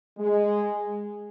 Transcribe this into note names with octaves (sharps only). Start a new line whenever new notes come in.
G#3